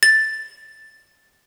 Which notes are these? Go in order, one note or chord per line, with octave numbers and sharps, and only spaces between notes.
A6